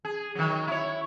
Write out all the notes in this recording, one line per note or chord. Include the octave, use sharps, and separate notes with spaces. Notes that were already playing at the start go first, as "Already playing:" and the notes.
G#4
D#3 F#3
E4 C#5